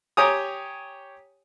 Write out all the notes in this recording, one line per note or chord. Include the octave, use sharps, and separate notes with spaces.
G4 C#5 G5 G#5 A#5 D#6